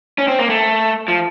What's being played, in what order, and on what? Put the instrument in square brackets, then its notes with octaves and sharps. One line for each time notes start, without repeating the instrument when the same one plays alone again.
[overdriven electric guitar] C#4
C4
A#3
A3
F3